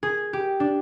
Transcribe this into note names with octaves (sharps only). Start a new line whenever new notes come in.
G#4
G4
D4